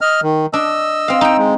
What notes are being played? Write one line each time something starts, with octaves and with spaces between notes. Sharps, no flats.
D#5 F6
D#3
D4 D#5 E6
C4 F5
D#4 G5
G#3